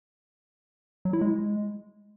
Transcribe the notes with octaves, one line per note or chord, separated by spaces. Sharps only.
F#3
E4
G#3